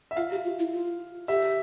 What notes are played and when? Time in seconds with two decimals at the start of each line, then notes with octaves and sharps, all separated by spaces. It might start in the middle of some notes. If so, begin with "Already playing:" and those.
0.11 E5
0.16 F4 F5
0.31 G4
0.44 F4
0.59 E4
0.73 F4
1.28 G4 E5